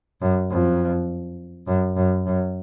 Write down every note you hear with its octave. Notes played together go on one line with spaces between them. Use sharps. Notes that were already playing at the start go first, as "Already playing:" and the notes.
F#2
F2
F#2
F#2
F#2